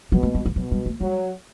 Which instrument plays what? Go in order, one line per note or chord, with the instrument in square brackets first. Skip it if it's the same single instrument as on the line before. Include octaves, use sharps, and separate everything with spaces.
[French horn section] B2 [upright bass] F#3
[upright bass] A3
G3
E3
[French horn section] B2 [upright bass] F#3
[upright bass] G3
A3
[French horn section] F#3 [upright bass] G3